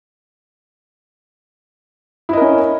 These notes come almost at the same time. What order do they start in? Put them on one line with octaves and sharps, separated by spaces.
E4 D#5 A#4 C#4